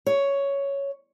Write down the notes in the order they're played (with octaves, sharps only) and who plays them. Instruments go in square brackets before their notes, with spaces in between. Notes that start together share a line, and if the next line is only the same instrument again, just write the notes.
[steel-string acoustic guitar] C#5